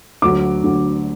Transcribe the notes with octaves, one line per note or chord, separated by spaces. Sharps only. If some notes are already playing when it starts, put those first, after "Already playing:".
D2 D3 F#3 D6
D2 D3 F#3